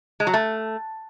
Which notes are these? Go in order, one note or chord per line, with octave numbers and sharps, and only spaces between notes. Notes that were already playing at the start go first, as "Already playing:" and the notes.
G#3
F#3
A3